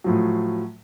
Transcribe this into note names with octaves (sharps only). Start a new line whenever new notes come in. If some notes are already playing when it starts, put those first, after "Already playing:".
A2 F3 F#3